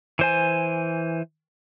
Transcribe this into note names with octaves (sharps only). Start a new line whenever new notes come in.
E3 C5 G#5